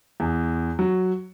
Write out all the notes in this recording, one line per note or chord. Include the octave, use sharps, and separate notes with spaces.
E2
F#3